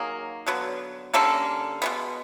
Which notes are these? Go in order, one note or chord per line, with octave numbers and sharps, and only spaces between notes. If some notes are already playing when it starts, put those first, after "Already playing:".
Already playing: D#3 F#3 A#3 G#4
D3 F#3 B3
D3 G3 A#3 C#4 A4
B2 G#3 B3